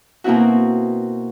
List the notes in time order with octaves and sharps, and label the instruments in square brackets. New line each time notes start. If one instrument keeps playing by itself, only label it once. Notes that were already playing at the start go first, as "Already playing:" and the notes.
[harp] B2 A#3 C4 E4 F#4